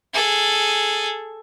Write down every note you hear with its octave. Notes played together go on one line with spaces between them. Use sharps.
G#4 A4